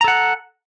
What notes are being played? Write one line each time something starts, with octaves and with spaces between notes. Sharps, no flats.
A4 F#5 A#5